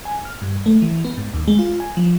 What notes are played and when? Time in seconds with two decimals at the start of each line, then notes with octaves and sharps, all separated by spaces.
0.05 G#5
0.25 F6
0.42 G2
0.66 A3
0.82 E3
1.05 B3
1.17 G#2
1.34 D#2
1.48 G#3
1.59 F4
1.80 G#5
1.97 F3